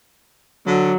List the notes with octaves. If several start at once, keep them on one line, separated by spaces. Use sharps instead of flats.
D3 F#3